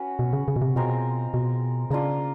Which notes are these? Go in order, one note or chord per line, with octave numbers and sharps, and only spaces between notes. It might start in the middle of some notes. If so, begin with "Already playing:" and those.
Already playing: C#4 F#4 B4
B2
C#3
C#3
B2
C3
B2 G#3 C4 F4 A#4
B2
C#3 A#3 D4 F4